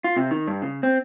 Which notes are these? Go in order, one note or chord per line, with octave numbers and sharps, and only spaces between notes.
F4
C3
D#3
G2
C#3
C4